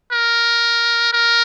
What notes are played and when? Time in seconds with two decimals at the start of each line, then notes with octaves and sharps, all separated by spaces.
0.12 A#4
1.13 A#4